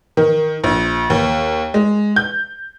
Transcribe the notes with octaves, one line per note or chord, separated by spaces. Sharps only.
D#3
A#1
D#2
G#3
G6